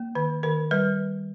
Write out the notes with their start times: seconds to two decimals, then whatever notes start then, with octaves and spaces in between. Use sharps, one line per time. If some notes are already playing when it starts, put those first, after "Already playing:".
Already playing: A#3
0.15 D#3 B4
0.43 D#3 A#4
0.71 G3 B4